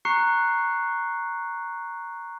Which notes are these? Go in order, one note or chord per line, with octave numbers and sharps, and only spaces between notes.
A#5 C#6 F#6 C7 C#7